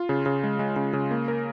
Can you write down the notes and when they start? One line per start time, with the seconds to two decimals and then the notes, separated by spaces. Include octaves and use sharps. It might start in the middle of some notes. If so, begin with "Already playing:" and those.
Already playing: F4
0.09 C#3
0.26 C#3
0.43 G#3
0.59 G#3
0.76 C#3
0.93 C#3
1.11 A#3
1.28 A#4